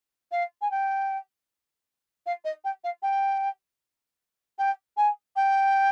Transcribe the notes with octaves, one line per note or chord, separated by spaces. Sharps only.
F5
G#5
G5
F5
D#5
G5
F5
G5
G5
G#5
G5